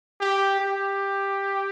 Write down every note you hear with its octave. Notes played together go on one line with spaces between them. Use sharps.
G4
G4